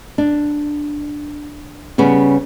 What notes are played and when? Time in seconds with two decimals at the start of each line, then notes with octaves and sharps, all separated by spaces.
0.18 D4
1.98 C#3 G3 B3 C#4